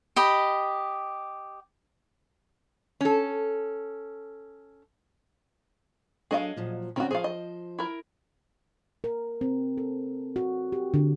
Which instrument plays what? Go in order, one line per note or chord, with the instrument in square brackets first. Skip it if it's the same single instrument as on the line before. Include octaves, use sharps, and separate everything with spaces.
[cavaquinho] G4 D#5 B5
[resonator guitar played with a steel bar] C#4 A4
[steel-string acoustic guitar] F#3 D4 A4 [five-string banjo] G#4 D#5 F5
[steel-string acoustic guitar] A#2 F3 F#3
[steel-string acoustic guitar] D3 C4 C#4 [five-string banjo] D#3 F#4
[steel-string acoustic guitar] F3 C5 [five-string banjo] G#4 F5
[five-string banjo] D#5
E4 A#4
[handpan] A#4
C4
A4
F#4
G4
D3